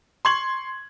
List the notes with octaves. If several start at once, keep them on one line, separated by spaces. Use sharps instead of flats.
C6 C#6 G#6 F#7